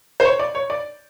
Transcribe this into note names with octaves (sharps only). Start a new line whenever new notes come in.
C5
C#5
D5
C#5
D5